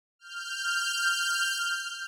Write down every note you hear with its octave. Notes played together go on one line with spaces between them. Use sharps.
F6 G6